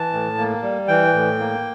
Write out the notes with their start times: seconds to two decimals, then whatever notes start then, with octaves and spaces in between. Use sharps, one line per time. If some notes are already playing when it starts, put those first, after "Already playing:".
Already playing: E3 A5
0.13 A2
0.38 A#3
0.63 G3
0.88 E3 G5
1.13 A2
1.39 A#3